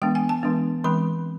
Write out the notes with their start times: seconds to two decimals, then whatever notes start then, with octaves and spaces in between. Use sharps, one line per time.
0.02 E3 G#3 B3 D4 G5
0.15 G#5
0.29 A5
0.43 E3 G#3 B3 D4
0.84 E3 G#3 C4 B5